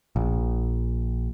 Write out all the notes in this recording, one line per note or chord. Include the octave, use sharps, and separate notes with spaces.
A#1